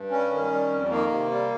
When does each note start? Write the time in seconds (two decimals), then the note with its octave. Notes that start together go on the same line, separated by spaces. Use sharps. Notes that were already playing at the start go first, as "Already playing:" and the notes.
Already playing: G2
0.10 G3 C#4
0.30 D#3
0.50 G3
0.70 F2
0.90 D#3 A#3
1.10 C3
1.30 G3